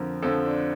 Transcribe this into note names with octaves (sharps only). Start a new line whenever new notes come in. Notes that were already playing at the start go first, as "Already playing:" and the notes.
Already playing: F2 D3 F3 A#4
F2 D3 F3 A4
D4